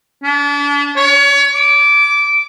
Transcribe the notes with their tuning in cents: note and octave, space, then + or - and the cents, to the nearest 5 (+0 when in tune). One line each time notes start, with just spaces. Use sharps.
D4 -35
C#5 +30
D6 -15